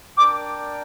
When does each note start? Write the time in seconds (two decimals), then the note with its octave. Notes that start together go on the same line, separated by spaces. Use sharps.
0.17 D4 A#4 D5 G5 D6